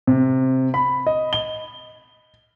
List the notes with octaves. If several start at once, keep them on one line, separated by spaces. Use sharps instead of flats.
C3
B5
D#5
G7